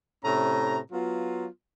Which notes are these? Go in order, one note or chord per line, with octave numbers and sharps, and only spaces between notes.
A2 C3 C#4 A#5
F#3 B3 F4